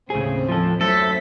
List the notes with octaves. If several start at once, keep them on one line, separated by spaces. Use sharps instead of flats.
D#2 A2 C#3 C4 G#4
F3 A4
F#2 A3 A4 C5 B6